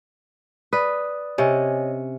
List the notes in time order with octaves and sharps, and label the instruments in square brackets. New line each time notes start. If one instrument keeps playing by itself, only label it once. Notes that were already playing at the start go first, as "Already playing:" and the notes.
[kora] B4 [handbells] D5 D#6
[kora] C3 C#4 [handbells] C#5 D#5 G#5